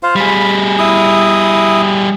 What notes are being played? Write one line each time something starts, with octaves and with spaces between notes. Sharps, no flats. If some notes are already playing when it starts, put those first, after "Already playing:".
F4 C5 F5
G3 G#4 B5
E4 D#6